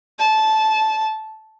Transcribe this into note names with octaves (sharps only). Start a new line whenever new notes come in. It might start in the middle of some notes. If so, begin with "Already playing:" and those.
A5